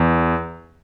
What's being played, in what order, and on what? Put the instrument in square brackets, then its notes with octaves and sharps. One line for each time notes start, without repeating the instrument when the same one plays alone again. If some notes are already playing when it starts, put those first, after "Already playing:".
Already playing: [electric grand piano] E2